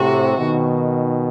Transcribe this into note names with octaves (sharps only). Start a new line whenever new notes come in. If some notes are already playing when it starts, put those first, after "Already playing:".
Already playing: A2 C3 F#4
B2 D#3